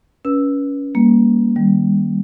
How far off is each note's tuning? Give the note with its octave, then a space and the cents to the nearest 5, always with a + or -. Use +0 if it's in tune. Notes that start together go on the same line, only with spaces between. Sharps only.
C#4 +20 B4 -30 E6 +0
G3 +35 A#3 +20
D#3 -15 G3 +0